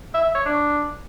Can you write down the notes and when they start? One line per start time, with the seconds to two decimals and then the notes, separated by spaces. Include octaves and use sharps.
0.14 E5
0.25 E5
0.35 C#5
0.45 D4